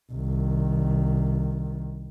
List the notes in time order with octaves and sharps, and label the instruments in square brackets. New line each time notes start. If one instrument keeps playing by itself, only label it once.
[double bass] C2 D#3